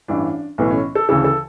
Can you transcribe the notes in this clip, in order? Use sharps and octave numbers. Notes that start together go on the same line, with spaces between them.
A1 G2 E3 D4
B1 A2 E3 B3
C#4
A4
D2 C#3 E3 A4
A4